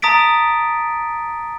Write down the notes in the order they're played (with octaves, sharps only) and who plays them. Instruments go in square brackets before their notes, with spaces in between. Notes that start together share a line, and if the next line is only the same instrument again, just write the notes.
[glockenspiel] A5 A#5 D#6 A6 B6 D7